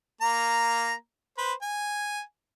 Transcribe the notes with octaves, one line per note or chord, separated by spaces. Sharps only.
A#3 A#5
B4 C5
G#5